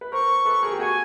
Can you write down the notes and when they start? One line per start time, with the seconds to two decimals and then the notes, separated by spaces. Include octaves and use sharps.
0.01 B4
0.12 A#4 C5 C#6
0.45 A4 B4
0.63 G#4 A#4
0.72 G4
0.79 F#4 G#4 G#5